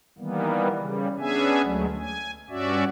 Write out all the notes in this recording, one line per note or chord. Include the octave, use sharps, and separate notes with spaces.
D#3 E3 G3 A#3 B3
C#3 G3
B3 C#4 D4 G#4 E5 G#5
D2 F#3 G#3 A3
G#5
G2 C#4 F#4 D5 E5